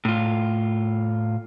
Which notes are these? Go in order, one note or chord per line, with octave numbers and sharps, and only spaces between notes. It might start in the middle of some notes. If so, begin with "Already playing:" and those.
A2 F4